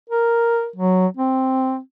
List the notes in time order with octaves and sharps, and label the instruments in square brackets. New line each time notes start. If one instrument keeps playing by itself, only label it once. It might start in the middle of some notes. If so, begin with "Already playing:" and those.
[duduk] A#4
F#3
C4